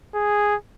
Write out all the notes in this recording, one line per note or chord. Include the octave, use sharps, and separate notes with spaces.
G#4